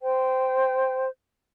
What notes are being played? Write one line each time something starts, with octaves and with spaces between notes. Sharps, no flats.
C5 G5